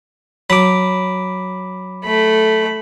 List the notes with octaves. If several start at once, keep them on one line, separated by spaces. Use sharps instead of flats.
F#3 B5 D6
A3 B5